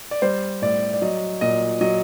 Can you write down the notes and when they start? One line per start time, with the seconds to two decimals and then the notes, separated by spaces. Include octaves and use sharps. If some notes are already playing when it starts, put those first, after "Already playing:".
0.11 D5
0.22 G3 C5
0.62 A2 D5
0.94 D5
1.02 F#3 D#5
1.41 A#2 D#5
1.81 F#3 D#5